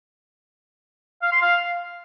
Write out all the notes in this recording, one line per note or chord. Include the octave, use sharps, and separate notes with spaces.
F5
C6
F5